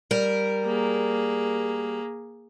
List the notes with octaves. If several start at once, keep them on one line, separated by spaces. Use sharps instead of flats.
G3 A#4
A#3 G#4